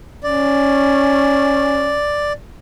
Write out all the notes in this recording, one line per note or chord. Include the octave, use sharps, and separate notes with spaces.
C#4 D5